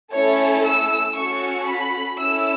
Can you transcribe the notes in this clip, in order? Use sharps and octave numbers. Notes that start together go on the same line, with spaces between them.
A3 C#4 E4 A4 C#5
E6
C#4 F#4 A4 C#6
B5
C#4 E4 A4 E6